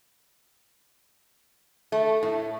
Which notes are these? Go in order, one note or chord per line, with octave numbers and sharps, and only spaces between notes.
A3
A2